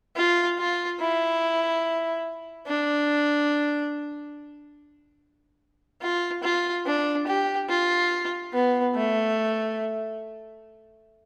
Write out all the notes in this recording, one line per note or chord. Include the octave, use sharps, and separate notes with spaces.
F4
F4
E4
D4
F4
F4
D4
G4
F4
B3
A3